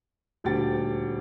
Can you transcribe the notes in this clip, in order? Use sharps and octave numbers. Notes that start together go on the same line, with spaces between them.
D#1 D2 G4 G5 A6